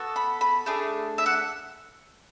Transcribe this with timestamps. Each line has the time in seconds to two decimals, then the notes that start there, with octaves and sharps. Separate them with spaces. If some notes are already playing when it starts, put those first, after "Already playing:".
Already playing: B3 F#4 A4
0.16 B5
0.41 B5
0.66 A3 D4 G#4
1.18 E5
1.26 F#5